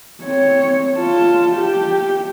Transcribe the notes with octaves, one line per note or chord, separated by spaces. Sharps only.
C4 C#5
F4 A5
G4